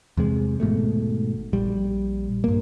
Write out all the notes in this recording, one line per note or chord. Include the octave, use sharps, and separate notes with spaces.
E2 C3 G#3
G#1 G#2 B2 A3
A#1 G3
G2 A#3